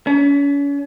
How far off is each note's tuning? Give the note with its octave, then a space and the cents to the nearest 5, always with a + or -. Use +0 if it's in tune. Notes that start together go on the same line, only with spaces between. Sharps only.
C#4 +40